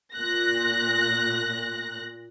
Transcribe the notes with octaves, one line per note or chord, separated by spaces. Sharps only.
A#2 F#6 A#6